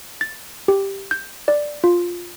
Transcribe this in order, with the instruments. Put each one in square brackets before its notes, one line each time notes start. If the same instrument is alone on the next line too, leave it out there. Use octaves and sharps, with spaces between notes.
[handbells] A6
G4
G6
D5
F4